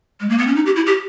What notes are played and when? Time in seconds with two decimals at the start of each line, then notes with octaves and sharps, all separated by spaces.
0.20 G#3
0.29 A#3
0.38 B3
0.47 C#4
0.56 D#4
0.66 G4
0.76 E4
0.86 G4